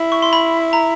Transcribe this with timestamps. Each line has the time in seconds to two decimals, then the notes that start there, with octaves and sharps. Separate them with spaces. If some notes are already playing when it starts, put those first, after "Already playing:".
Already playing: E4
0.12 C#6
0.22 C6
0.33 B5
0.73 A#5